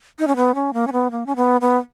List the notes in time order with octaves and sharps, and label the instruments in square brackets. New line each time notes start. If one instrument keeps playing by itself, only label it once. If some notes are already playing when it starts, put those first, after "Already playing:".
[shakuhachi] D#4
C#4
B3
C#4
A#3
C#4
B3
A#3
C#4
B3
B3